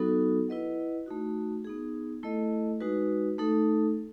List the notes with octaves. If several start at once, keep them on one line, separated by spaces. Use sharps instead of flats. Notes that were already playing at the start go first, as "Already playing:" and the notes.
Already playing: F#3 B3 D#4 F#4 A4
E4 B4 D#5 F#5
A3 D#4 F#4
B3 D#4 G#4
A3 E4 A4 D#5
G#3 D#4 F#4 B4
A3 D#4 A4